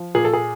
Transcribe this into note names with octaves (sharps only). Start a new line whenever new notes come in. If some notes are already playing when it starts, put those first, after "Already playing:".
Already playing: F3
A#2 G#4
A4
G#4